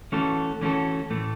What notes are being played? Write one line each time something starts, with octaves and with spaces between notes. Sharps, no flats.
E3 A3 C#4 F#4 A4
E3 A3 C#4 F#4 A4
A2 E3 A3